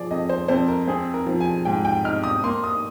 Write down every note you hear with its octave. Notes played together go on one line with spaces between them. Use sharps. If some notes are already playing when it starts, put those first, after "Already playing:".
Already playing: F3 G#4 D5
F2 D#5
C5
F2 C5
A#4
C4 G#4
A#4
F3
G#5
G#2 G5
G5
D#4 F6
D#6
A#3 C6
D#6